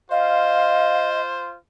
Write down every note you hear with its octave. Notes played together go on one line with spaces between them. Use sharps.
F4 C5 D#5 F5